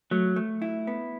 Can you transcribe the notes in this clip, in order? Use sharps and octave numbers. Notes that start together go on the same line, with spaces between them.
F#3 A3
A3
E4
B3